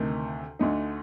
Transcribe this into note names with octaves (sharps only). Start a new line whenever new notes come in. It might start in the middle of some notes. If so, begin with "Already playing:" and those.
Already playing: D2 C3 D#3 A3
D2 D3 A3 D#4